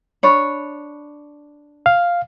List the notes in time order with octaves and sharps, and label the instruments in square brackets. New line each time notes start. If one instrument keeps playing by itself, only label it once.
[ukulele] D4 C#5 B5
[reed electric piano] F5